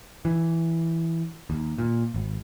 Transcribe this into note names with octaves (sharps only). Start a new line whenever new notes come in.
E3
D#2
A#2
G#1